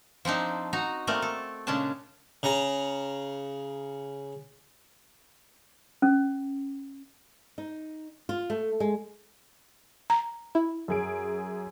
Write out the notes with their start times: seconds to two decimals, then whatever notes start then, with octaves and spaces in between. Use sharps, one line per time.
0.25 F3 C4 D4 D#4
0.73 D#4 F#4 A#5
1.07 A3 A#3 C4 A#4 D5
1.22 A4
1.67 A#2 C#3 G#3 C#4 D4 A5
2.43 C#3 A#5
6.02 C#4
7.58 D#4
8.29 F4
8.50 A3
8.80 G#3
10.10 A#5
10.55 E4
10.88 F#2 G#4 D7